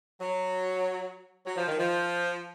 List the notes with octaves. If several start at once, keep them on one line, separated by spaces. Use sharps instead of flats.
F#3
F#3
F3
D#3
F3